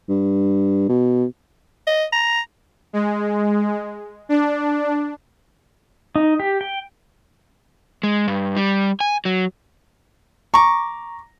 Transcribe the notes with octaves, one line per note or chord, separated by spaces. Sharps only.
G2
B2
D#5
A#5
G#3
D4
D#4
G4
G5
G#3
G2
G3
G#5
F#3
A#5 C#6 D6